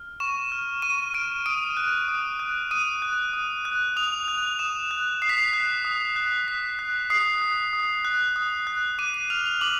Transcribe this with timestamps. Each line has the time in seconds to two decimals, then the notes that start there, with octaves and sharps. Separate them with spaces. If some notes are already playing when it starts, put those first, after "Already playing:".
Already playing: F6
0.20 C#6 E7
0.52 F6
0.82 C#6 D#7
1.14 F6 D7
1.46 D#6 D7
1.77 F#6
2.08 D#6
2.39 F#6
2.71 D#6 D#7
3.02 F#6
3.33 D#6
3.65 F#6
3.96 D#6 F7
4.28 F#6
4.59 D#6 E7
4.91 F#6
5.22 D#6 C7
5.29 B6
5.37 C7
5.53 F#6
5.85 D#6
6.16 F#6
6.47 D#6 B6
6.79 F#6
7.10 D#6 C7
7.42 F#6
7.73 D#6
8.05 F#6
8.36 D#6
8.67 F#6
8.98 D6 D#7
9.14 D#7
9.30 F6 F7
9.46 F7
9.61 D6 F#7